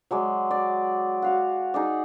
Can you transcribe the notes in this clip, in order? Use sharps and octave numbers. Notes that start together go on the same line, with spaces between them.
F#3 G#3 D5
D5
F#4 F5 F#5
D#4 G#4 D5